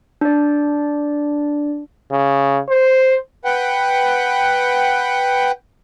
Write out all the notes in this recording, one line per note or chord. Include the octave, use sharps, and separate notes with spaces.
D4 D5
C#3
C5
B4 F#5 G5